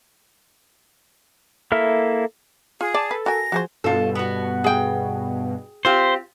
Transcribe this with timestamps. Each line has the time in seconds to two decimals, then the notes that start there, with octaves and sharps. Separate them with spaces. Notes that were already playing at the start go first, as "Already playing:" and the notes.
1.72 A#3 E4 A4 E5 F6
2.81 F4 G#4
2.94 D5 A5
3.11 A4 B4
3.26 F#4 A#4 G#5 A#6
3.52 F3 F#4 G#4 C5
3.84 G2 B2 F4 A4
4.15 B3 F#4
4.64 G#4 G5
5.85 C4 F4 G4 C5